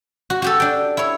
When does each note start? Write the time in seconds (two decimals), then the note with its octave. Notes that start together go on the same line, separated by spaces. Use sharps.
0.30 F#4
0.42 F#4 G4 A4
0.60 D4 G5
0.97 E4 C#5